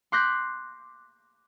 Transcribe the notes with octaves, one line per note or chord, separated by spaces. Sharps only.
C6 D6 F#6 G6 A#6 B6